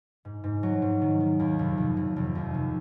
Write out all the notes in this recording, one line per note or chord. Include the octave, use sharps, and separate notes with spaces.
G#2
G#2
F#3
G#2
D#3
D#3
D#2
F1
F1
F1
F1
D#2
F1